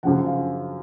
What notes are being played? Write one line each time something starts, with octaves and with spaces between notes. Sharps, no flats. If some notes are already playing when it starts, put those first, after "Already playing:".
F#2 C#3 F3 F#5
F5